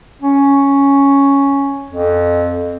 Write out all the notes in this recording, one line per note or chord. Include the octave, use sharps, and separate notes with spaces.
C#4
F2